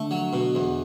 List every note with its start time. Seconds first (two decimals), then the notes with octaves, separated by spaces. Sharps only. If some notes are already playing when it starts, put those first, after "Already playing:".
Already playing: D3 A3
0.11 F#3
0.33 B2
0.55 E2